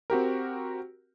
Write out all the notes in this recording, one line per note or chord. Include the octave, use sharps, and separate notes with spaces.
C4 F#4 G4 A#4